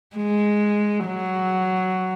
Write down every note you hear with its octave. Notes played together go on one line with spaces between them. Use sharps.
G#3
F#3